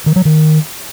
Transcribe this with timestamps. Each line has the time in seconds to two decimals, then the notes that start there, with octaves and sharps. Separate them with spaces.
0.06 D#3
0.16 F#3
0.25 D#3